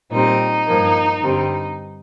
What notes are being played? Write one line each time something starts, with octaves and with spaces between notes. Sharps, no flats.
A#2 G3 C4 D#4
G2 F3 A#3
G2 D3 G3 C4